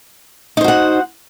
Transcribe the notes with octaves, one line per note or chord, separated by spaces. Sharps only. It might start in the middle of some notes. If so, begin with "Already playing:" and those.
D#4 F#4 C5 F#5